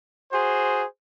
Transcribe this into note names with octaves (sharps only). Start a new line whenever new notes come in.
F#4 G#4 C5